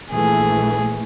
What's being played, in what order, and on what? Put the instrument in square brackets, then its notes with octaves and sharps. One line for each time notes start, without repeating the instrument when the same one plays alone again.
[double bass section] A#1 E3 A3 [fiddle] G#4